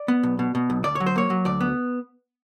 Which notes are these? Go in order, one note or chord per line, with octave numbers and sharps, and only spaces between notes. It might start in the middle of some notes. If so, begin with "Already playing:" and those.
Already playing: D5
B3
B1
B2
B2
B1
D2 D5
C#5
F#3
C5
A#3 C#5
F#3
D2 D5
B3